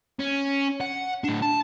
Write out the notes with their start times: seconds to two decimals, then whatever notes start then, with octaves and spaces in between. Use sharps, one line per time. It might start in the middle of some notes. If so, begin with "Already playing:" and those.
0.20 C#4
0.81 F#5
1.24 A2 D4
1.43 A5